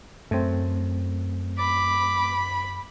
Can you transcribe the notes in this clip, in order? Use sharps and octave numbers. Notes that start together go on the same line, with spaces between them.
F#2 A3 C4
B5 D6